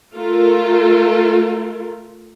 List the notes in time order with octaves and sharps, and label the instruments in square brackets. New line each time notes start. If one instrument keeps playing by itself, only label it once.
[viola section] A3 F4 A4 A#4